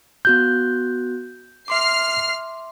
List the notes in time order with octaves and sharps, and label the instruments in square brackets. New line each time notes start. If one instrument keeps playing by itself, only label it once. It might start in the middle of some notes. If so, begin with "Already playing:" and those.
[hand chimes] B3 F#4 F#6 [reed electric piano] G6
[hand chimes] E5 C6 D6 [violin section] F6 C7